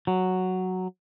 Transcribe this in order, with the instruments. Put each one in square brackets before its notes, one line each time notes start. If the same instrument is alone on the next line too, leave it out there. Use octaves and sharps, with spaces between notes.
[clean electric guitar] F#3